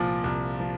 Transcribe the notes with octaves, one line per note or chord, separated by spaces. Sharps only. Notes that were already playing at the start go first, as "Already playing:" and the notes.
Already playing: C2 A#2 F3
C2
F3